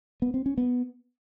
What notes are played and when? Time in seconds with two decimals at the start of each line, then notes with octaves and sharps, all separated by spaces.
0.22 B3
0.34 C4
0.46 C#4
0.58 B3